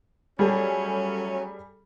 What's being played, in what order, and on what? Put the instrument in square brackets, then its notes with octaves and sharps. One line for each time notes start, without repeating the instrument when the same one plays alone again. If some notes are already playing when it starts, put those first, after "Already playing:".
[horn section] F#3 A3 C#4 [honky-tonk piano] G3 G#4 A4